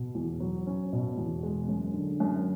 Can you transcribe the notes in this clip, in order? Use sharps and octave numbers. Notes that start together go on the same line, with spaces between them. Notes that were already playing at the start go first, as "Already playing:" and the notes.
Already playing: B2
E2
F#3
C#4
B2
E2
G#3
F#2
D3
F#2